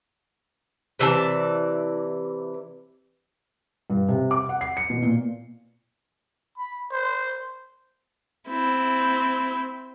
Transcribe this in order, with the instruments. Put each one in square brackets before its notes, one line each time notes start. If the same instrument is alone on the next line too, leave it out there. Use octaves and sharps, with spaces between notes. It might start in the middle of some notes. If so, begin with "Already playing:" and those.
[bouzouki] C3 E3 D5 A5
[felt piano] G2
C3
D6
F#5
C7
C#7
B2
A#2
[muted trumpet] B5
C5
[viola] C4 E4